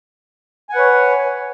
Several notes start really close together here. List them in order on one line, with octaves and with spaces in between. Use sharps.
G#5 F#5 B4 C#5